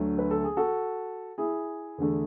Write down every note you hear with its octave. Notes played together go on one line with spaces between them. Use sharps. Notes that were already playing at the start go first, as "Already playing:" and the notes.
Already playing: D2 D3 F#3 A3
B4
A4
G#4
F#4 A4
E4 G#4
E2 D3 A3